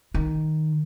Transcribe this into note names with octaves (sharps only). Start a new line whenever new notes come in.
D#3